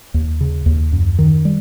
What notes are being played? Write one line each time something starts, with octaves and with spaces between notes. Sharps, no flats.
D#2
C#3
D#2
F#2
D#3
G3